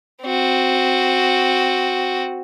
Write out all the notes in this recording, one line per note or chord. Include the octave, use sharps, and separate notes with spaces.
C4 F#4